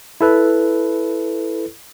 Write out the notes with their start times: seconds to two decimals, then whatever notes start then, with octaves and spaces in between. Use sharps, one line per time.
0.21 E4 A4 B4